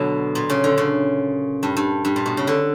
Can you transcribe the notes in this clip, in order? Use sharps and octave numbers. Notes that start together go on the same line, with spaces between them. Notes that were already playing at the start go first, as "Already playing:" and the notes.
Already playing: B2 D3 F#3
A#2
C#3
D3
C#3
G2
G2
G2
A#2
B2
C#3
D3